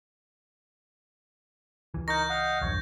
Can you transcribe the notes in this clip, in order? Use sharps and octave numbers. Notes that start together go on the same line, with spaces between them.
C#2 E3
D#4 A#4 C#6 G6 A#6
D#5 F5 F#5
B1 E2 G2 C#5